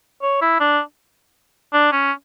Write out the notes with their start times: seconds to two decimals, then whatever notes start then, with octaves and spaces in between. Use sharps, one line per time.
0.22 C#5
0.41 E4
0.60 D4
1.73 D4
1.92 C#4